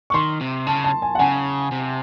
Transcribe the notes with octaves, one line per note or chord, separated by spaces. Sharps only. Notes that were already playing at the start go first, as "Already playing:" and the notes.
C#6
D#3 C6
C3
C#3 A5
A5
G#5
F#5
C#3 G#5
C3